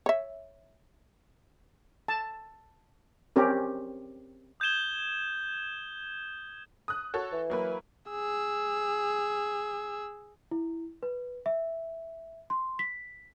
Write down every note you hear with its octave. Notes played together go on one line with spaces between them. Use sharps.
C#5 E5
A5
C4 C#4 G4 A#4
D#6 G6 G#6 E7 G7
D#6 F#6
F#4 A4 C#5
E3
F#3 A#3 B4
G#4 E6
E4
B4
E5
C6
B6